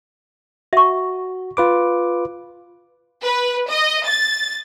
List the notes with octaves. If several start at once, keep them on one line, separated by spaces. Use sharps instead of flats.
F#4 E5 C#6
F4 B4 D6
B4
D#5
A6